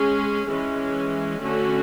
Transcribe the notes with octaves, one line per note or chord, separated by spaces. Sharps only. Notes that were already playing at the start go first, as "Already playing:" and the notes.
Already playing: G#3 C#4 G#4
E3 G#3 C#4
D3 A3 C#4 F#4